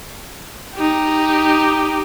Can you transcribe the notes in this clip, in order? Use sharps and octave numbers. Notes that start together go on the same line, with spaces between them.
D#4 G4